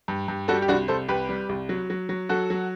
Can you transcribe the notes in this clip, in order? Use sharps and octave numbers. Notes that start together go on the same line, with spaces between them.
G2
G2
G3 F#4 A4
G4
C2 D4 F#4
C2 A4 C5
C2 G4 B4
G3
C2
F#3
F#3
F#3
F#3 F#4 A4
F#3